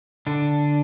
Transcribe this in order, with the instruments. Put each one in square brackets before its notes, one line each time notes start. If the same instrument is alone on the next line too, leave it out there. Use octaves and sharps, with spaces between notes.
[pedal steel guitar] D3 D4